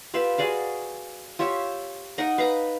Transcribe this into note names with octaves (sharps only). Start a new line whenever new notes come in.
F4 G4 B4 E5
F#4 G#4 D5 F5
F4 G4 C#5 E5
D#4 A#4 D#5 F#5
B4 F5 A#5